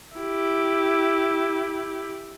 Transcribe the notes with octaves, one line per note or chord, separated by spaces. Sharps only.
E4 G4